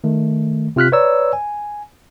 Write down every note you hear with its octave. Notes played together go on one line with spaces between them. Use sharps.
D#3 A3
C3 F4 F6 F#6 B6
B4 C#5 D5 A#5 E6
G#5